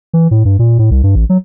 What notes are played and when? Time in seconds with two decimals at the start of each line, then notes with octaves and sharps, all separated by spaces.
0.14 E3
0.31 A2
0.45 G2
0.59 A#2
0.79 A2
0.91 C2
1.03 G2
1.15 A1
1.29 F#3